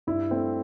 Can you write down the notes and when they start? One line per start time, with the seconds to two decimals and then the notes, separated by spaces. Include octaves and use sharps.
0.07 G2 E4
0.31 A3 C4